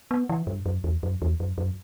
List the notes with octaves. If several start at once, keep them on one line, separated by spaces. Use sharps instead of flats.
B3
E3
G2
F#2
E2
F#2
E2
F#2
F#2